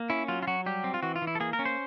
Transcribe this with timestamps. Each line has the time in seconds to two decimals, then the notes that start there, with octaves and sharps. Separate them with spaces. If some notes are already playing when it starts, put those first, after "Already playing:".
Already playing: A#3
0.10 C#4 E4
0.28 F#3 F4
0.43 F4
0.47 F#3 F#4
0.66 G3 G4
0.84 C4
0.94 F4
1.03 E3 F#4
1.16 F4
1.22 E3
1.27 E4
1.35 A4
1.40 A#3 G#4
1.53 A#4
1.59 C#4
1.65 C5